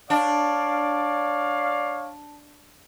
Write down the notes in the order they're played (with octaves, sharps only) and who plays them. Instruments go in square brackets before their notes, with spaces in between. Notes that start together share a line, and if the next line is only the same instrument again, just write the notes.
[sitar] D4 [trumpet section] C#5 D5 F5